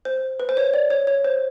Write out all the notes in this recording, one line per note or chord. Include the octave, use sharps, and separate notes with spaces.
C5
B4
C5
C#5
D5
C#5
C#5
C5